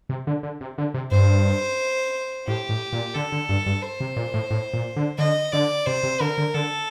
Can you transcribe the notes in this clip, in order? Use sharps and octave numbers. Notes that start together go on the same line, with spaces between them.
C3
D3
D3
C3
D3
C3
G2 C5
A2 G4
A2
A#2
D3 A4
D3
G2
G2
C5
C3
A#2
A2
A2
A#2
D3
D3 D#5
D3 D5
C3 C5
C3
D3 A#4
D3
D3 A4